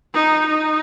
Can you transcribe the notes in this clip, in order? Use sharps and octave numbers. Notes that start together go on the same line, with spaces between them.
D#4
D#4